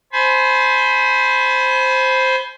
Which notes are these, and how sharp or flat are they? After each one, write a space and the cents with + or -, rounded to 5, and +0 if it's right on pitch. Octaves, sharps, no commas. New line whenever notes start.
C5 +0 G#5 +35 B5 +0